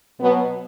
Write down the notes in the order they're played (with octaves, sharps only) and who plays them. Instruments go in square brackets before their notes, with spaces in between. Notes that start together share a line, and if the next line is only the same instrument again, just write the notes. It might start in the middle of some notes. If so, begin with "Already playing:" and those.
[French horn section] B2 F#3 B3